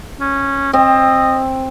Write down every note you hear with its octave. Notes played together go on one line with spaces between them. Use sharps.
C#4
C4 D#5